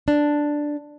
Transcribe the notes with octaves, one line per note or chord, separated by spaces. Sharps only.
D4